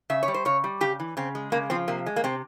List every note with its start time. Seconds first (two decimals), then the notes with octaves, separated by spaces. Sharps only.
0.10 C#3 E5
0.23 C#5
0.28 G3
0.34 C5
0.45 C#3 C#5
0.64 G3
0.81 C#3 G4
1.00 E3
1.17 C#3 C4
1.35 G#3
1.52 C#3 A#3
1.70 F3 C4
1.88 C3 A#3
2.06 G#3
2.16 A#3
2.24 C3 C4